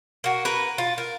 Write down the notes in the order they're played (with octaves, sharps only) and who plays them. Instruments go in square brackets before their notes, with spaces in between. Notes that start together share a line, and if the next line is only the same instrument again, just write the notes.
[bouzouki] A#3 F#4
A#4 B4
F4
A#4